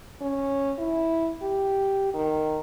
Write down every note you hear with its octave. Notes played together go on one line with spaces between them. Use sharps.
C#4
E4
G4
D#3